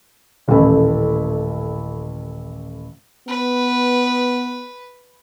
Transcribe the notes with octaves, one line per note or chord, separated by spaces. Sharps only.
D#1 A1 E3 A3 E4
B3 B4